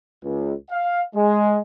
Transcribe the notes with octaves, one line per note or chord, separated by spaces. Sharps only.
C#2
F5
G#3